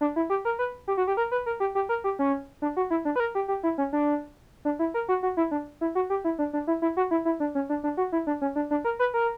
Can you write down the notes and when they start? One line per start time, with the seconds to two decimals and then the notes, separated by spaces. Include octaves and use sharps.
0.01 D4
0.16 E4
0.30 G4
0.45 A#4
0.59 B4
0.88 G4
0.97 F#4
1.07 G4
1.17 A#4
1.31 B4
1.46 A#4
1.60 G4
1.75 G4
1.89 A#4
2.04 G4
2.19 C#4
2.62 D4
2.77 F#4
2.90 E4
3.05 D4
3.16 B4
3.20 A#4
3.35 G4
3.48 G4
3.63 E4
3.78 C#4
3.93 D4
4.65 D4
4.79 E4
4.94 A#4
5.09 F#4
5.23 F#4
5.37 E4
5.51 D4
5.81 E4
5.95 F#4
6.10 G4
6.24 E4
6.39 D4
6.53 D4
6.67 E4
6.82 E4
6.97 F#4
7.11 E4
7.25 E4
7.40 D4
7.55 C#4
7.69 D4
7.84 D4
7.97 F#4
8.12 E4
8.27 D4
8.41 C#4
8.56 D4
8.71 D4
8.85 A#4
8.99 B4
9.14 A#4